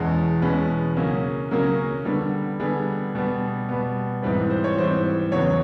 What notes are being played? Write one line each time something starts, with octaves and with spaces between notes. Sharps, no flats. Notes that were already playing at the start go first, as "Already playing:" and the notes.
Already playing: E2 B2 G#3 C#4
E2 B2 G#3 C#4 B4
C#3 F#3 A#3 C#4
C#3 F#3 A#3 C#4 A#4
D3 G3 B3
D3 G3 B3 G#4
B2 G3 B3
B2 G3 B3
G#2 E3 G3 C4 B4
C5
C#5
G#2 E3 G3 C4 C5
E2 C#3 F#3 B3 C#5